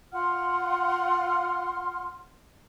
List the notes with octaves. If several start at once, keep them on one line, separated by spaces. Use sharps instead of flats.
F4 F#5 C6 F6